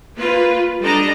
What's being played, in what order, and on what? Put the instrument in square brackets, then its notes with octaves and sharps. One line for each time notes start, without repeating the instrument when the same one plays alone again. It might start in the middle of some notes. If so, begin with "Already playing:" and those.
[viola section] A#3 F4 B4
G3 D4 A4 D5 D#5 A#5